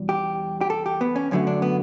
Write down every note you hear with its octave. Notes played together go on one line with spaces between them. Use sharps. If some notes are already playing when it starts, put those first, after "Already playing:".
Already playing: E2 B2 G3
G4
G4
A4
G4
B3
C#4
F#2 D3 F#3 A3 C#4
D4
B3